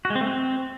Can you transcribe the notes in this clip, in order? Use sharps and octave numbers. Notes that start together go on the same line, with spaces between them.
F#4
G#3
C4
A3
C4